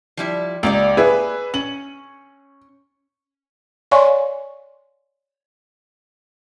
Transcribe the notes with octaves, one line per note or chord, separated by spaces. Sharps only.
F3 G3 E4
C#2 A#3 G4 D5
G#4 B4 E5
C#4 F#7
C#5 D5 F5 G#5 C6 C#6